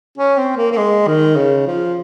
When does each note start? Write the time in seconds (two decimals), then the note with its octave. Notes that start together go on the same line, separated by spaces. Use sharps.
0.18 C#4
0.37 C4
0.57 A#3
0.72 A#3
0.77 G#3
1.07 D#3
1.36 C#3
1.67 F3